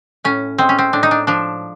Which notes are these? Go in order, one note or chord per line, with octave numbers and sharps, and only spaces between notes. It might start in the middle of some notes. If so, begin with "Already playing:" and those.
A2 C#4
G#3 C4
C#4
C4
A2 D4
D#4
D4
F3 D4